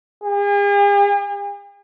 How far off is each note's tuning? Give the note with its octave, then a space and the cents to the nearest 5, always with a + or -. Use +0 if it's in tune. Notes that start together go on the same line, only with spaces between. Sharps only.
G#4 -45